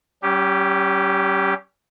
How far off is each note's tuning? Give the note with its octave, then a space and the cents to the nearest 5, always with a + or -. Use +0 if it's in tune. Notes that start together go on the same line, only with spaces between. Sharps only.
G3 -45 C#4 +0 G4 +0